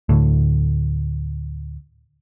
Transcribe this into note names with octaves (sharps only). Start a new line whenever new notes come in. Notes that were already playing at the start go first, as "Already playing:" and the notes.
D2 A2